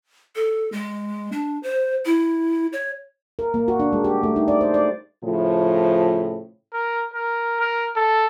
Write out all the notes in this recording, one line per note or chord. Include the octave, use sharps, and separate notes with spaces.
A4
G#3
D4
C5
E4
C#5
A#4
A#3
F#4
D4
G#3
G4
A3
D#4
D5
C5
D5
A2 C#3 F3
A#4
A#4
A#4
A4